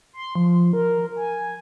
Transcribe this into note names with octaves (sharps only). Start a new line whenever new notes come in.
C6
F3
A#4
G#5